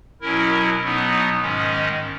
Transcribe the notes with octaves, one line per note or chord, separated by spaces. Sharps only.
B2 F#3 C#4 E4 A#4
B2 F#3 B3 D#4
G#2 D#3 G#3 C#4
D#5